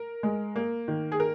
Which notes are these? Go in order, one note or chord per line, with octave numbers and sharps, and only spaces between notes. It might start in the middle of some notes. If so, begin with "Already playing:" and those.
Already playing: A#4
G#3
A#3
D#3
G#4
A#4